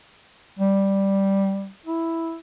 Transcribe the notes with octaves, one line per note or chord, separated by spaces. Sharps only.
G3
E4